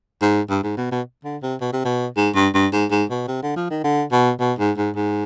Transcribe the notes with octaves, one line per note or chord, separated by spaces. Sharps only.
G#2
G2
G#2
B2
B2
D3
C3
B2
C3
B2
G#2
G2
G2
G#2
G#2
B2
C3
D3
F3
D#3
D3
B2
B2
G#2
G#2
G#2